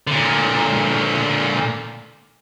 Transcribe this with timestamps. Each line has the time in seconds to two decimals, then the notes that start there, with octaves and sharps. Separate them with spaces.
0.07 A#2 D3